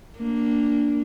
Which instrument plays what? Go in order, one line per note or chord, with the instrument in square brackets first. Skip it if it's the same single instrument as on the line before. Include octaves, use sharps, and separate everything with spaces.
[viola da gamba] A#3 D4